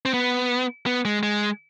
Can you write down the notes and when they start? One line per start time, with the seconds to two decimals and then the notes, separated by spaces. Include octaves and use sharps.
0.05 C4
0.14 B3
0.86 B3
1.05 G#3
1.23 G#3